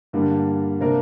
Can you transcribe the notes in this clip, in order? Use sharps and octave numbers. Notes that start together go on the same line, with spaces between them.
G2 D3 G3 A#3
C3 A#3 D4 A#4